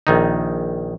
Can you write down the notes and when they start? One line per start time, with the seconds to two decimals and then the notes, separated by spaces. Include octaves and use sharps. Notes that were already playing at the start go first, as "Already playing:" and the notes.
0.07 A#1 D#3 D#4